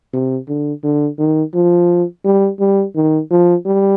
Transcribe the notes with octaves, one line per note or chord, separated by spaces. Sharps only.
C3
D3
D3
D#3
F3
G3
G3
D#3
F3
G3